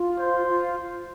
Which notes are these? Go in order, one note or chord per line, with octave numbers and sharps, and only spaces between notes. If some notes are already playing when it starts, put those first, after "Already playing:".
Already playing: F4
C5
F4